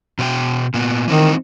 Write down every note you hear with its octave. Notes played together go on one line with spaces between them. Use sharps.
B2 C5 G5
A#2 B3
D#3 E3 C4 D#4